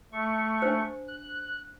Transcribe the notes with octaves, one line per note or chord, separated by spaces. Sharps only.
A3 C#6
D4 C5
F#6